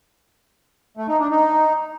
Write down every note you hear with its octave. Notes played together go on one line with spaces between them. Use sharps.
A3
D#4
D4
D#4